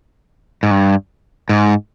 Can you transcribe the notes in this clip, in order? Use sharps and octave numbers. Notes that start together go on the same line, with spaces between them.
G#2
G2
G#2